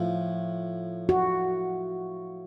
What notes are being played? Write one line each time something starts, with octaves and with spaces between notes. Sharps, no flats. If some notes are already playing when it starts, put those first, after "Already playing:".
Already playing: A2 F3 F4
F#4